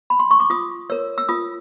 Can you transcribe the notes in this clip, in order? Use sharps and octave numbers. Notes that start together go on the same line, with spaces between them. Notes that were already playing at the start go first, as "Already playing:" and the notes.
B5
C6
C#6
D6
F4 D#6
A#4 C#5 E6
E6
F4 D#6